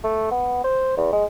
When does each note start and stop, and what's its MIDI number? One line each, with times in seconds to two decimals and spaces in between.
0.04 0.29 57
0.31 0.62 59
0.64 0.93 72
0.97 1.09 40
1.13 1.25 56